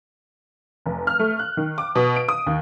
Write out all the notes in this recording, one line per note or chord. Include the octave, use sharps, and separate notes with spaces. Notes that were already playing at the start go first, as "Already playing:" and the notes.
F1
F6
A3
F#6
D#3
D6
B2
D7
D#6
D#2